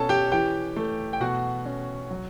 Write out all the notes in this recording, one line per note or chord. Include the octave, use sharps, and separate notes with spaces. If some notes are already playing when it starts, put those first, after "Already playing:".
Already playing: B2 C#4 A4 A5
G4 G5
E3 G4 G5
A3
G5
B2 F#4 F#5
C#4
F#3